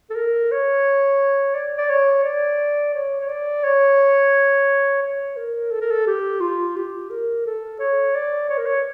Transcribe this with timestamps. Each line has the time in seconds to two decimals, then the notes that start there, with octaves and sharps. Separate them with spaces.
0.10 A4
0.16 A#4
0.51 C#5
1.55 D5
1.78 D5
1.90 C#5
2.24 D5
2.94 C#5
3.20 C#5
3.29 D5
3.64 C#5
5.02 C#5
5.37 A#4
5.71 A4
5.81 A#4
5.91 A4
6.07 G4
6.41 F4
6.77 G4
7.10 A#4
7.46 A4
7.80 C#5
8.15 D5
8.50 C#5
8.58 A#4
8.66 C#5